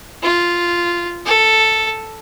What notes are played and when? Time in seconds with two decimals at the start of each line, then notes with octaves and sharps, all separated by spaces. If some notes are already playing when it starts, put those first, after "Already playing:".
0.23 F4
1.26 A4